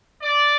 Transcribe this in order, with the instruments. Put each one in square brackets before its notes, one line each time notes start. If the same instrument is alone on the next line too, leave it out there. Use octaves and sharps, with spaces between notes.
[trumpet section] D5